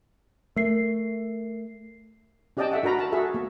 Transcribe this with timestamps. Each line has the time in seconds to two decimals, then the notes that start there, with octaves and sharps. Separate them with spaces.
0.56 A3 A#4 C7
2.57 C#4 G4 D5 D#5 G5 A5
2.71 A4 E5 F#5
2.83 D4 F#4 A#4 A#5 B5
2.99 A5
3.12 F#4 G#4 A4 E5
3.34 A#3